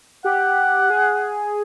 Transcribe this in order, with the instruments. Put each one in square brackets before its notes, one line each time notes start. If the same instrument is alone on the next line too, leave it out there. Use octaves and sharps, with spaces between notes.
[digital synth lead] G4 [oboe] F#5
[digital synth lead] G#4